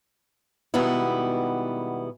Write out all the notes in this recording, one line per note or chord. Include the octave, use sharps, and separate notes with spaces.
B2 D#3 G3 G#3 B3 E4